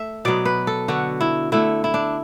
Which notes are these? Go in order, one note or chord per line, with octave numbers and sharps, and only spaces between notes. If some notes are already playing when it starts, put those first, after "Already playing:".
Already playing: A3 E5
B2 F#3 B3 D5
B4
A4
D3 B3 F#4
E4
D3 A3 E4
E4
D4